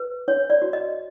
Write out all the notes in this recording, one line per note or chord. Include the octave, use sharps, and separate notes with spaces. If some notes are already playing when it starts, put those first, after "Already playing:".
Already playing: B4
D4 C#5
D5
F#4
D#5